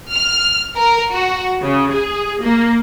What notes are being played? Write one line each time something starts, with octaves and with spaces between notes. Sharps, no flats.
F6
A#4
F#4
C#3
G#4
A#3